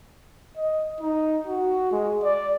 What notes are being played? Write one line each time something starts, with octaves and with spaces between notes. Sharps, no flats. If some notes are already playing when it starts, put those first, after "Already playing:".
D#5
D#4
F#4
G#3
D5